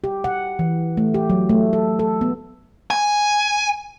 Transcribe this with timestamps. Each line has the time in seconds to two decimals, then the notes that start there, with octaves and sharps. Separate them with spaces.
0.04 G4
0.24 F#5
0.59 E3
0.97 A3
1.14 G4
1.30 F#3
1.49 A3
1.73 A4
1.99 A4
2.21 B3
2.91 G#5